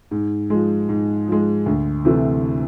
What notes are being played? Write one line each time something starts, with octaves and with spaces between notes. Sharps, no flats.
G#2
F3 G#3
G#2
F3 G#3
D2
C3 E3 A3